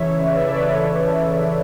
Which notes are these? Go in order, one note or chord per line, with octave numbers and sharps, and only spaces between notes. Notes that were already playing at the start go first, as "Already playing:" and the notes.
Already playing: C#3 E3 C#5 E5
C#3 D5
E5
B4 D5
A4 C#5
E3
C#3
E3